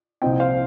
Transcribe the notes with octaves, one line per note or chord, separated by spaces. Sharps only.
C2 A#2 F3 C4 D#5 G5
C5 F5